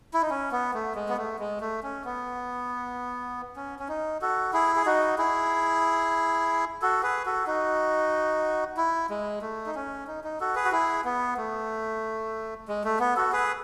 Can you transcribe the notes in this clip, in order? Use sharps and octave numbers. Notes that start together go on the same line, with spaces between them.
E4
D#4
C#4
B3
A3
G#3
B3
A3
G#3
A3
C#4
B3
C#4
C#4
D#4
F#4 A4
E4 G#4
G#4
D#4 F#4
E4 G#4
F#4 A4
G#4 B4
F#4 A4
D#4 F#4
E4
G#3
A3
D#4
C#4
D#4
D#4
F#4 A4
G#4 B4
F#4
E4 G#4
B3
A3
G#3
A3
B3
F#4 A4
G#4 B4